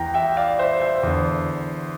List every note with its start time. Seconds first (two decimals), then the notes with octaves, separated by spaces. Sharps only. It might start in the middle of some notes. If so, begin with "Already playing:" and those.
Already playing: E2 E3 G5 A#5
0.14 E5 G5
0.37 D5 F5
0.59 C5 E5
0.81 C5 E5
1.03 E2 D3